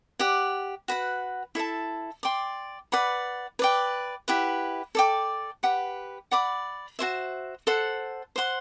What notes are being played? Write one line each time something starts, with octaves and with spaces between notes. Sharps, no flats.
G4 D5 F#5
F#4 B4 F#5
E4 A4 E5 A5
D5 G5 C6
B4 D5 F#5 B5
B4 D5 G5
E4 G4 B4 F#5
A4 D5 G5 D6
G4 B4 F#5
D5 F#5 B5 D6
F#4 A4 C5 E5
A4 C5 F#5
C5 F#5 C6